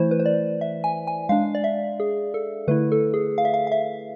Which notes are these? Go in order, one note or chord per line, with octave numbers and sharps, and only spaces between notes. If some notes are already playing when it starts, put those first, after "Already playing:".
Already playing: E3 A3 E4 C5
B4
C5
D5
E5
G#5
G#5
G#3 D4 F5
D5
E5
G#4
A4
D3 A3 E4 B4
A4
G#4
F5
E5
F5
F5
E5